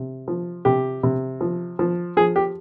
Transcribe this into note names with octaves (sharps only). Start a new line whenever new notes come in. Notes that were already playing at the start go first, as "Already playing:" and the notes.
Already playing: C3
F3
C3 G4
C3
F3
F3
F3 G#4
G4